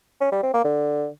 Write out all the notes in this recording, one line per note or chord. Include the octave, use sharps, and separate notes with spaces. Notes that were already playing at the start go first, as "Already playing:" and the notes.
C#4
G3
C4
A#3
D3